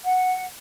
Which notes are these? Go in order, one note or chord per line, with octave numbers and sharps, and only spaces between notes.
F#5